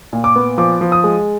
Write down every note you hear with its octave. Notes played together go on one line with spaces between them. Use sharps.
A#2
D6
B3
F3 D6
F3
D#6
G#3